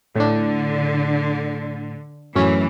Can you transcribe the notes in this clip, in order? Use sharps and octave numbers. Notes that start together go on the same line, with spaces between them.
A2 D3 D4
F#2 A2 E3 C#4